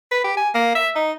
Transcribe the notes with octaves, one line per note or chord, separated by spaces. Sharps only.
B4
G4
G#5
A#3
E5
D#4